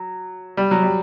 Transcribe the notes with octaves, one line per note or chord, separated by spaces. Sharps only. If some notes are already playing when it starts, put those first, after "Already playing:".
Already playing: F#3
G3
F#3
G3